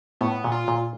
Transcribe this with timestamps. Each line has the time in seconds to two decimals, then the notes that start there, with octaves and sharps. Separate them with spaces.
0.21 A2 B3
0.44 A#2
0.52 F4
0.68 A#2